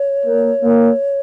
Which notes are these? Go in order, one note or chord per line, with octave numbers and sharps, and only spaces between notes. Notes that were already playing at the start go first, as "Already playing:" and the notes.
Already playing: C#5
A#3
A#3